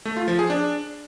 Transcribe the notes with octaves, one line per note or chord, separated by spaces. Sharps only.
A3
F4
F3
G#4
D4